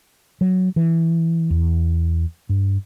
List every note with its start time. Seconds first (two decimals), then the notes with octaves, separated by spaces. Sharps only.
0.41 F#3
0.76 E3
1.50 E2
2.49 G2